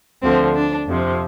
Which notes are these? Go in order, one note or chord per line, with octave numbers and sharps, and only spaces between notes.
D2 D3 F3 C4
D4
F2 C3 F3